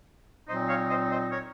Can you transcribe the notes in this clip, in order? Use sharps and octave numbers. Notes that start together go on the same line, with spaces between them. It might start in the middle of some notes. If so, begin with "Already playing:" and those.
A#2 F#3 C4 D#4 C5 D#5
C#5 F5
C5 D#5
C5 D#5
A#4 C#5